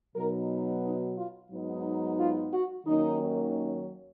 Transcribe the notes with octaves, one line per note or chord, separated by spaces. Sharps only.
B2 F#3 B3 D#4 A#4
D#4
F4
G#2 F#3 B3 D#4
F4
F#4
D#2 D#3 F#3 A#3 C#4 D#4